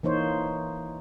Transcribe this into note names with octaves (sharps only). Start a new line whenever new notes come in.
E3 A#3 D#4 C5 C#5